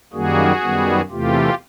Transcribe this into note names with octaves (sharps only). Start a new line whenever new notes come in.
F#2 D#3 G3 A#3 F#4 G#4
F#2 D#3 G3 B3
E2 C3 E3 A3 F4 G4